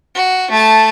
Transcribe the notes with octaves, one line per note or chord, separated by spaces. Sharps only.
F#4
A3 A5